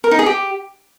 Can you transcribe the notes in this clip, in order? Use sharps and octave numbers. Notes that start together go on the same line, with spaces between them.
A#4
D#4
G#4
G4